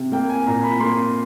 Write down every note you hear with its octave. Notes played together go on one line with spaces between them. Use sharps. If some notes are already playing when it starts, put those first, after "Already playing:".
Already playing: C3
A#3 G5
G#5
A#2 A#5
B5
A#3 C6